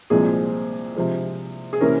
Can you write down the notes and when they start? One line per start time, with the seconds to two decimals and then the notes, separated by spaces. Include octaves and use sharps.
0.10 C2 A#2 F3 G#3 C4 G#4
0.96 C3 F3 G#3
1.73 G#4
1.80 C3 E3 A#3 C#4 A#4